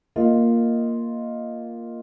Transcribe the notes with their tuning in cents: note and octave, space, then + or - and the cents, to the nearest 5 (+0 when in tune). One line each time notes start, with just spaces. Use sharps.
A#3 +0 F4 +0 D#5 +0